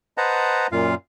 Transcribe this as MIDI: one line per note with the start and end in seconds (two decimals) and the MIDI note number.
0.18 0.67 71
0.18 0.67 72
0.18 0.67 75
0.18 0.67 78
0.18 0.67 81
0.18 0.67 82
0.72 0.95 42
0.72 0.95 46
0.72 0.95 65
0.72 0.95 77